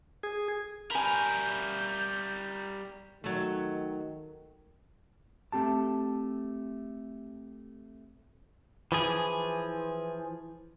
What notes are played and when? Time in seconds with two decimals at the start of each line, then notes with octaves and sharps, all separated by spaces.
0.23 G#4
0.91 G3 A#4 G#5 B5 G6
3.24 D#3 F#3 A3
5.52 A3 C4 G4 A5
8.92 E3 F3 G#4